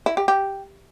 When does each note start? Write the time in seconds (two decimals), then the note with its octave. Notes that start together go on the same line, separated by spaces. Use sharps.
0.06 E4
0.17 G4
0.28 G4